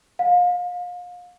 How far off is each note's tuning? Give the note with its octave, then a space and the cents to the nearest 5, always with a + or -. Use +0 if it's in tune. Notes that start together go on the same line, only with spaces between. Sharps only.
F5 +30